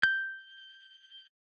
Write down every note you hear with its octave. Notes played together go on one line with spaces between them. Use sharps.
G6